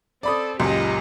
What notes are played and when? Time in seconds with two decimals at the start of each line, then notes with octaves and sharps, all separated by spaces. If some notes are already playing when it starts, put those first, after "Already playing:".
0.23 C4 A4 D5 B5 D#6
0.60 C#2 F#2 A#2 G4 D#5